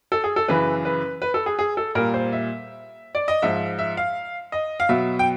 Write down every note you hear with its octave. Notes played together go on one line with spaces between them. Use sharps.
A4
G#4
A4
F#2 C#3 E3 B4
B4
B4
A4
G#4
G#4
A4
A#2 G3 A#4
C5
E5
D5
D#5
G#2 F3 E5
E5
F5
D#5
F5
B2 F#3 E5
G5